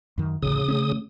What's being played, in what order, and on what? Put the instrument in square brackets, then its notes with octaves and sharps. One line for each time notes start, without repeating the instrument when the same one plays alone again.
[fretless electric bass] F#2 D#3
[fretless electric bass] A1 D2 [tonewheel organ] C#3 D#6
[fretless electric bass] A3 A#3 C#4